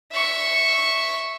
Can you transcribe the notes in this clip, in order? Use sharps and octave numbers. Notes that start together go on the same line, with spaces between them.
E5 C#6